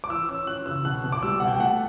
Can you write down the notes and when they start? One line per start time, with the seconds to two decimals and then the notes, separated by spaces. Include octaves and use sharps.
0.04 D6
0.10 E3 E6
0.29 C#4 E6
0.47 E3 F#6
0.66 C#3 E6
0.85 B2 F#6
1.04 B2
1.12 D6
1.23 G3 E6
1.40 B2 F#5
1.48 G5
1.60 A3 F#5